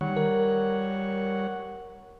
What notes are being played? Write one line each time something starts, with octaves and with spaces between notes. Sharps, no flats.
D#3 G3 C#5 F#5
A#4